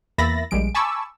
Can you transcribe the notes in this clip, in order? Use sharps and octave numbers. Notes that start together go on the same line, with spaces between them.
E2 A#3 E5 B5 A6 A#6
A#1 G3 G#3 D7
G#5 A5 B5 C#6 D6 E6